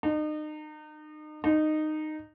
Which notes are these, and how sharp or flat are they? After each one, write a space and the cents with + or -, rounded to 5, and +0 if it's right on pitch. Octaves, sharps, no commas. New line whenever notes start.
D#4 -35
D#4 -15